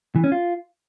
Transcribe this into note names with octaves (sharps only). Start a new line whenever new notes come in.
E3
C#4
F4